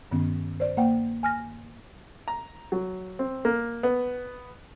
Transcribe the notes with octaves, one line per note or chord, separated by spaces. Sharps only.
G2 D#3 B3 C#4
C5 D5
A#3 C5 F#5 G5
G#5 F6 A#6
A#5
F#3
C4
A#3
B3